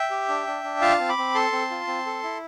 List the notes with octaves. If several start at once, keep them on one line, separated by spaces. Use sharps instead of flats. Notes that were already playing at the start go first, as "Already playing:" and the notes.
Already playing: E5 G5
G4
D4
D4
D4
F4 F5 A5
C4
B5 D6
C4
A4 A5 C6
C4
F4
C4
A4
E4